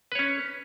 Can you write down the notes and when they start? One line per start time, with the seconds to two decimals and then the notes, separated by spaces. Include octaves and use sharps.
0.12 B4
0.15 C#5
0.19 C#4